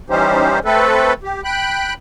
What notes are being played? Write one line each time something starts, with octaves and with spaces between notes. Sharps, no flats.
E3 G3 C#4 D#4 G4 C5
A3 C4 A4 B4
G4
G5 B5 F#6